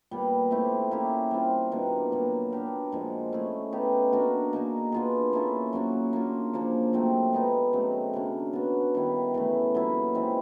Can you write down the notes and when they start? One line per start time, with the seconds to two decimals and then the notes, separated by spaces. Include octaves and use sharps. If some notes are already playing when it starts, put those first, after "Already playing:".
0.11 A#2 G3 B3
0.51 A3 C4 E4 G4
0.91 A#3 C#4 E4 G4
1.31 G3 C4 F4
1.72 B2 G3 A#3 D4
2.12 A#2 F#3 B3
2.52 B3 D4 G4 A#4
2.92 A#2 F3 G#3
3.32 A3 C#4 E4 G#4
3.72 B3 D#4 G4
4.13 A#3 D4 F#4 A#4
4.53 A#3 D#4 G#4
4.92 B3 D4 F4 G#4
5.33 A#3 C#4 E4 A4
5.73 F#3 A#3 C#4 F#4
6.13 A#3 D4 F4
6.53 C#3 F3 A#3 D4
6.93 A#2 F#3 A3 C4
7.33 G#3 B3 D#4
7.73 C#3 F#3 A3 C4
8.13 C#3 F#3 A#3 D4
8.53 B3 D4 F#4
8.95 D#3 G3 B3 E4
9.34 C#3 E3 A3
9.75 A#2 F#3 B3 E4
10.14 E3 G#3 C4